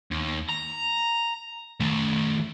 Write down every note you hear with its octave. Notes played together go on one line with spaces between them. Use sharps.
D#2
A#5
D#3 A3